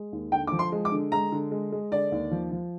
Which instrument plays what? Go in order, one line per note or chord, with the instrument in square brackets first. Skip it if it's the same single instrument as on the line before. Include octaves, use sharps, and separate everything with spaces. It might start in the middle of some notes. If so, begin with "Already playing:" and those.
Already playing: [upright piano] G#3
D#2
D3 G5
F3 D6
C6
G#3
D6
D3
G#3 A#5
D3
G#3
G#3
D3 D5
D#2
F3
F3